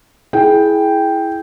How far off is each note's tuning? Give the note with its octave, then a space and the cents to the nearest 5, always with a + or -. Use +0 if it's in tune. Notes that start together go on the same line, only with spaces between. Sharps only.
E4 +0 G#4 +20 G5 +0